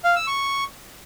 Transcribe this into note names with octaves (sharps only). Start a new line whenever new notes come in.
F5
E6
C#6